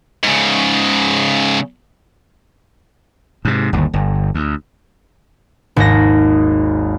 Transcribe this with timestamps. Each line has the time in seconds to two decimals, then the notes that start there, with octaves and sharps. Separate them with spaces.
0.24 G#2 C#3
3.45 G#2 C3
3.73 G1 D#2
3.93 G1
4.35 D2
5.76 G#1 D#2 A#6